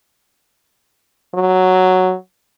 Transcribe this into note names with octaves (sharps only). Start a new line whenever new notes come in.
F#3